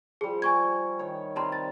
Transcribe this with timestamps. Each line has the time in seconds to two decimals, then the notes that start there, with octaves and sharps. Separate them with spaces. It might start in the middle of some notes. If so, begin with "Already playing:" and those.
0.21 F3 G3 G#4
0.42 G#5 C#6 G#6
0.99 D#3 C#5
1.36 C3 G3 A5 A#5 C6
1.52 A6